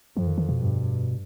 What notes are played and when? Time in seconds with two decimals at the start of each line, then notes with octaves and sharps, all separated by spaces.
0.16 F2 F3
0.27 D#3
0.38 D#3
0.49 B2
0.59 G2